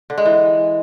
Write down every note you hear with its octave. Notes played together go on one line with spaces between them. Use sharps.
D3
G#3
E3